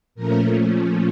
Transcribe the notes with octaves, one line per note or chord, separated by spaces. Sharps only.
A#2 F3 A3 C#4 A#4